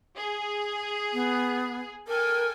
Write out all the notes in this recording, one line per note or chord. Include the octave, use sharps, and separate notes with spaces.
G#4
B3
A4 A#4 G5 G#5